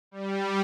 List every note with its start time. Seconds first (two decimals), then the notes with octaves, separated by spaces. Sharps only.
0.11 G3